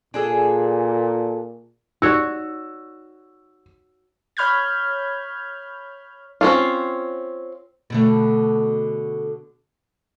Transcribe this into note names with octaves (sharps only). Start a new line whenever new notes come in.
A#2 D4 G#4 A4
D#4 F#4 C#5 D5 E6
C#5 B5 F6 G6 G#6
C4 C#4 F4
B2 D3 A3